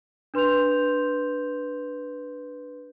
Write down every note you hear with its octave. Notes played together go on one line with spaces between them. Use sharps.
D4 B4 C6 G6 F7